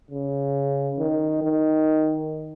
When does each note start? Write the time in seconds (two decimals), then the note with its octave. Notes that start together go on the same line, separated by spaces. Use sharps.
0.11 C#3
0.99 D#3
1.43 D#3